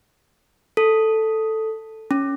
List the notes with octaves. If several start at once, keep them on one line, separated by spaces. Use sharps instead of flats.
A4
C#4